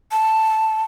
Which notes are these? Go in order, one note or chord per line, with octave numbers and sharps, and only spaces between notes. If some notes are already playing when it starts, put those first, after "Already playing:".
A5